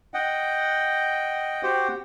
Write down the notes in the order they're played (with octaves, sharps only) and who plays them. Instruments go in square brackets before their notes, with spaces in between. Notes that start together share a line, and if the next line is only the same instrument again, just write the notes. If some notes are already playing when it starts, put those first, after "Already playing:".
[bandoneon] D#5 F#5 G5
F#4 G4 C5 F#5 G5